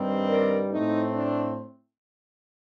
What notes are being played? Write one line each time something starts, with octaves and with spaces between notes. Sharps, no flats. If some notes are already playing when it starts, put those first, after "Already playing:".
Already playing: G2 D#3 G3 C4
A#4 D5
A2 A3 C4 D#4
D4